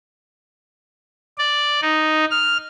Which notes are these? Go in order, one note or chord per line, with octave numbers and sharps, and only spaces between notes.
D5
D#4
F6